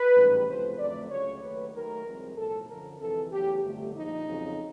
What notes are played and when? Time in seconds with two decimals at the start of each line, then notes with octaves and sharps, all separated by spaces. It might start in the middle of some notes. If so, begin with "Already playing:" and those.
Already playing: B4
0.15 A1 G#2 D#3 G3
0.47 C#2 C3 F3 A3 C5
0.79 F2 D3 F#3 A3 D5
1.10 C#2 C#3 F#3 A3 C#5
1.42 D#2 D#3 F#3 A3 B4
1.73 D#2 D#3 F#3 A3 A#4
2.05 C2 C3 F3 G#3
2.37 B1 A2 F3 A4
2.68 F#2 D3 F3 A#4
2.99 F2 C3 E3 G#3 A4
3.31 E2 C#3 F#3 A3 G4
3.63 G1 F2 D3 F#3 A3
3.94 A#1 A#2 F3 D#4
4.26 F2 C#3 F#3